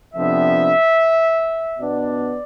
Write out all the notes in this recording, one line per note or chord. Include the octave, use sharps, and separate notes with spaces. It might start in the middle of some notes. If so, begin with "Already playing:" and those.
F2 C3 F3 B3 D4 E5
B2 B3 D4 D5